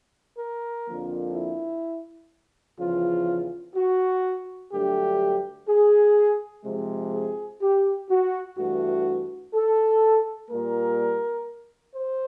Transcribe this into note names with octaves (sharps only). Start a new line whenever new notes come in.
A#4
F2 D3 F3 A#3
E4
E2 C#3 F3 F4
F#4
G2 D3 F#3 A3 G4
G#4
C3 F3 G#3
G#4
G4
F#4
G2 E3 A3 F#4
A4
A#2 G3 A#3 A#4
C5